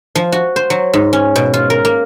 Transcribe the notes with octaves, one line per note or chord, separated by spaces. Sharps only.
F3
F#4
C5
F#3
G#2
C#4
B2
F4
A#4
A#3